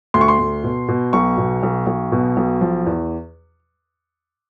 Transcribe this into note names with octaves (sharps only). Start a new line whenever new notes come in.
D2 C6
C#6
C6
D2
B2
B2
B1 C#6
B2
B1
B1
B2
B1
F3
E2